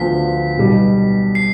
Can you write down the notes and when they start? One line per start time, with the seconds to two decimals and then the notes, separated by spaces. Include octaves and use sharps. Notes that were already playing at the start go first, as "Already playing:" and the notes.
Already playing: D2 D3 F3 B3 F4 B6
0.57 B1 B2 G3
1.35 C7